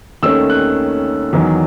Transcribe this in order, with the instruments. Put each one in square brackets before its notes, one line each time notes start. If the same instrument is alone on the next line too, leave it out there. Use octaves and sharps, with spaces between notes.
[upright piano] D#2 D#3 A3 C#4 E6
F#6
E2 D#3 F#3